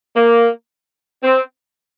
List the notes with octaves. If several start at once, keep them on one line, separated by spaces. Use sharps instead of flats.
A#3
C4